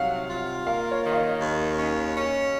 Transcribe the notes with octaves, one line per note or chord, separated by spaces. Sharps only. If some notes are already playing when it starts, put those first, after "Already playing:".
Already playing: C3 F#3 F5 F#5
F4
A#3 F5
C#5
D#3
F5
D#5
D#2
C#4
C#4